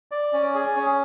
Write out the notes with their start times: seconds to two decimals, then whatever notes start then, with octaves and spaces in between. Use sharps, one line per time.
0.11 D5
0.33 C#4
0.55 G#4
0.76 C#4